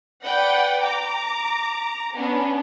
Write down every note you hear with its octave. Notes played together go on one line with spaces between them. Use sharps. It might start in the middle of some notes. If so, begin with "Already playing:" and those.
B4 D5 F#5 G5
A#5 D6
B3 C#4 D4